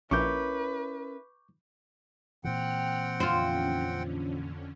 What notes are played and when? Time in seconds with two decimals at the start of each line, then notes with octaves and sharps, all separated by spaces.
0.11 A#1 C#4 E4 A#4 B4 C#6 D6 G6
2.44 A#2 E3 C4 F#5 G5 F6 F#6
3.20 F2 D3 C#4 F4 C5